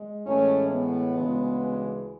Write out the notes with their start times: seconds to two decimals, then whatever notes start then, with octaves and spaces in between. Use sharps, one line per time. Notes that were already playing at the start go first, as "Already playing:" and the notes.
Already playing: G#3
0.26 A2 E3 G#3 A3 C#4
0.71 B3
1.16 D2 C#3 E3 G#3